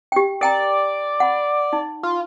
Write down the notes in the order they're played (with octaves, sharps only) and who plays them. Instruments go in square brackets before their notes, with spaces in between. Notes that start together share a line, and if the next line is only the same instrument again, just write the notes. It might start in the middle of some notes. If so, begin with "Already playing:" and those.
[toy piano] G4 G5
[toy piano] A#4 G5 A#5 [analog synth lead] D5
[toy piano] F#5 B5
D#4
[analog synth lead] F4